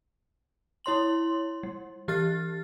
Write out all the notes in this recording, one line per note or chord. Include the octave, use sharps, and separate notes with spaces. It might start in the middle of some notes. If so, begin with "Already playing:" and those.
E4 C#5 C6 F#7
G3
E3 G4 F6 A6